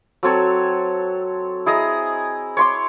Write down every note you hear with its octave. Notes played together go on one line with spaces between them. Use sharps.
F#3 C4 A4 C#5
E4 G#4 D#5 A#5
C#5 C6 D6